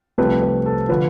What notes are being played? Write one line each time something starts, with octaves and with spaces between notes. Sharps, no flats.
C2 C3 F3 A3 B4
B4
A4
D3 F3 B4